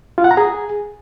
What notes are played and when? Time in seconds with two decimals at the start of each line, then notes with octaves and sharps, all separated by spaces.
0.18 F4
0.24 F#5
0.31 A#5
0.37 G#4